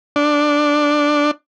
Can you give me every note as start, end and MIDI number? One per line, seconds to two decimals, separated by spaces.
0.16 1.31 62